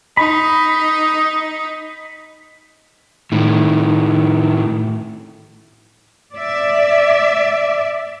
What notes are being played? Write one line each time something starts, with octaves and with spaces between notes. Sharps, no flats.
D#4 B5
A2 D#3
D5 E5